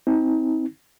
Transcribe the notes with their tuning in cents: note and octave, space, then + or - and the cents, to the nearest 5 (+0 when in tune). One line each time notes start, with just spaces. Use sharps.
C4 +0 D#4 +40